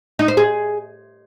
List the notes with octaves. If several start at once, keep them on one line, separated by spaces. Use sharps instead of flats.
D#4
C5
G#4